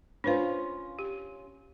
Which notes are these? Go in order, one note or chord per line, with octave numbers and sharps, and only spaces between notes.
C#4 D4 F4 B4 C5
G4